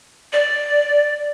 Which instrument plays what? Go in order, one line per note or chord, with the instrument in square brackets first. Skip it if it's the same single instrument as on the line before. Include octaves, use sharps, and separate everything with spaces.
[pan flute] D5